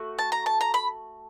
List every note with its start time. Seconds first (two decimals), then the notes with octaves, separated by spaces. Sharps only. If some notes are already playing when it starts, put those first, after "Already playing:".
Already playing: A3 F#4
0.19 A5
0.32 A#5
0.46 A5
0.61 A#5
0.74 B5